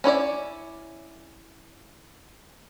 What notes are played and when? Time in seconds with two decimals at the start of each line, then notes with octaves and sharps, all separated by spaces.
0.04 C#4 E4 C#5 D5